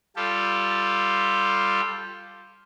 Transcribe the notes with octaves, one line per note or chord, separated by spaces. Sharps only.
G3 F4 G4 A4